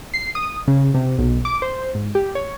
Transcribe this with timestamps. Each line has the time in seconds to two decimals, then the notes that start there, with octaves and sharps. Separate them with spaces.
0.14 C7
0.35 D#6
0.67 C#3
0.94 C3
1.18 B1
1.45 D6
1.62 C5
1.95 G#2
2.15 G4
2.35 C#5